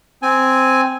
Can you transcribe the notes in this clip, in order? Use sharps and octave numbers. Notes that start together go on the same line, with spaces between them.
C4 G#5